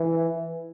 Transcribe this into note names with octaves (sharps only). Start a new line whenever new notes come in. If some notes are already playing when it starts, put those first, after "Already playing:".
Already playing: E3